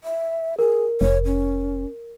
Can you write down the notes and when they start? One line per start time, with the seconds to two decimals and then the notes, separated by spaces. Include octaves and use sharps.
0.04 E5
0.59 G#4 A#4
1.01 F1 C#5
1.25 C#4